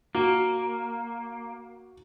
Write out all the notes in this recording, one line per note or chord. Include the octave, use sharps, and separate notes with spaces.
A#3 F#4